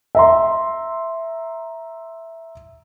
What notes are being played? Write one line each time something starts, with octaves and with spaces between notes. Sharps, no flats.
E5 A#5 C6